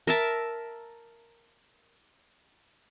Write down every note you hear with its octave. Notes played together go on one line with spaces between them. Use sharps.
A#4 E5 A5